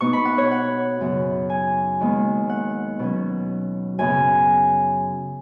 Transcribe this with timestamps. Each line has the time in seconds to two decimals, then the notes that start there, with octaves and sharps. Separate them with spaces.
0.01 B2 B3 D#4 C#6
0.13 B5
0.25 F#5
0.38 C#5
0.51 F#5
1.01 F#2 C#3 B3
1.50 G#5
2.01 D#2 D#3 G#3 B3
2.50 F#5
2.99 B2 F#3 C#4
3.99 F#2 C#3 B3 G#5